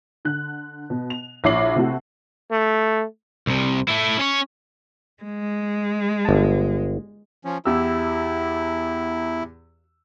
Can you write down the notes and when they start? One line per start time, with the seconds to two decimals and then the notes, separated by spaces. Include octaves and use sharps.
0.25 D3 F#6
0.90 B2
1.10 F7
1.44 A#1 E4 C#5 D6 C7 F#7
1.76 C3 A3 E4 F#4
2.51 A3
3.47 C2 C3
3.88 A3 E4
4.19 C#4 C#5
5.23 G#3
6.25 G1 A5
7.45 F3 C#4
7.65 E2 E4 G4 E6